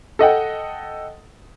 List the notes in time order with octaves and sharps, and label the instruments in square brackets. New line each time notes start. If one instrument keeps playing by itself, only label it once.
[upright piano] A4 D#5 F#5 G5